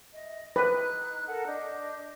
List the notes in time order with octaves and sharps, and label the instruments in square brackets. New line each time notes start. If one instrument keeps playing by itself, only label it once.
[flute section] D#5 E5
[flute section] D#4 F#6 [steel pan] B4
[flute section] A4 A#4 F#5
D4 D#5 G6